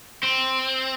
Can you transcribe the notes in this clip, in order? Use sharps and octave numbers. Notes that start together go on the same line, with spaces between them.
C4